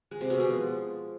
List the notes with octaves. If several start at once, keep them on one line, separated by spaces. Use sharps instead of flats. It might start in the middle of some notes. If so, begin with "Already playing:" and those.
G#3
C3
B2
G#3
F3